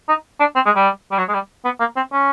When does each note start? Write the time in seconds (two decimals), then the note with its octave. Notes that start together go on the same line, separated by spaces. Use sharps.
0.09 D#4
0.40 D4
0.56 C4
0.66 G#3
0.76 G3
1.11 G3
1.18 F#3
1.29 G#3
1.34 G3
1.65 B3
1.80 A#3
1.97 C4
2.13 C#4